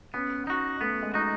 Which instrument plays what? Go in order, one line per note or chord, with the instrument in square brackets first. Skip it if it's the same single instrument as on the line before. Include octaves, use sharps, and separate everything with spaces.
[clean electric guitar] B3 [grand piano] C#4
[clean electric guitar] D#4 F#4
[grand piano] A3 [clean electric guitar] B3
[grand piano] G#3
[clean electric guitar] D#4 F#4